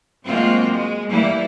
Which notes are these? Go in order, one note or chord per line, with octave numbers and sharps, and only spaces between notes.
F#3 G#3 A#3 C4 F4 F#4
G#3
E3 G3 A#3 E4